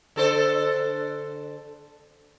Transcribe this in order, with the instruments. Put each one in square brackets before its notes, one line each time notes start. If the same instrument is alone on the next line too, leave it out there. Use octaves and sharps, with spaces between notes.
[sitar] D3 A4 C5